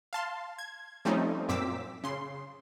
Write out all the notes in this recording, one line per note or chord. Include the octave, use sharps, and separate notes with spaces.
F5 A5 C6
G#6
F3 G3 A3 C4 C#4 D#4
F#2 A#2 C4 D6 E6 B6
C#3 C6